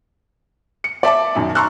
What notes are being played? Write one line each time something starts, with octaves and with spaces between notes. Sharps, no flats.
C#7
D5 E5 A5 D6
B1 F#2 D#3
A5 A#5 C6 C#6 E6 F#6